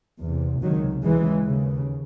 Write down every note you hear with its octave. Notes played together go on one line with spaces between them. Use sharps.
E2 C3
C#2 C3 D#3 F#3
D#2 C#3 E3 G#3
D#2 C#3